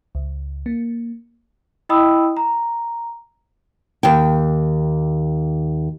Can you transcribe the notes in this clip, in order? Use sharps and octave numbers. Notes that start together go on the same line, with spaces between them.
C#2
A#3
E4 D#5 G5 B5 D#6 E6
A#5
D#2 G5